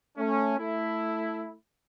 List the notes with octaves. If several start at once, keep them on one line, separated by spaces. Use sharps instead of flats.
A3 C#4
A3 E4